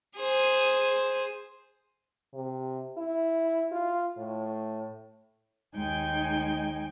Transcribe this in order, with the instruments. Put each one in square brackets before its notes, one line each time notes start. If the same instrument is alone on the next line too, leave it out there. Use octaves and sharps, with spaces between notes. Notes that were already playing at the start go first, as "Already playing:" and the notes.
[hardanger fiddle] G#4 C5
[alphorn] C3
E4
F4
A2
[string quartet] D#2 G#3 D#4 G5 G#5 G6